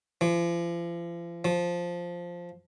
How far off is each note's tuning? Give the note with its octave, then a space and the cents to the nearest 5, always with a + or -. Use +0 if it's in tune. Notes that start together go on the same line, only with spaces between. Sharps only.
F3 -40
F3 +0